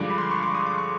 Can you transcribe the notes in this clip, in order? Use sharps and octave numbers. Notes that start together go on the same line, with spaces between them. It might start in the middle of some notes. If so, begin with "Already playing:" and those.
Already playing: G2 D3 F3 G#3 D6
B5
C6
C#6
D6
D#6
D6
C#6